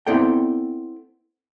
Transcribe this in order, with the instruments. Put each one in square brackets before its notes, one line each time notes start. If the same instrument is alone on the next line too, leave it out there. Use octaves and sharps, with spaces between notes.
[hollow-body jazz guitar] B3 C4 E4 A4 D5 G5